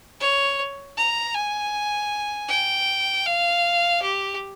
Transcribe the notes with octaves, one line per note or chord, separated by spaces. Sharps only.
C#5
A#5
G#5
G5
F5
G4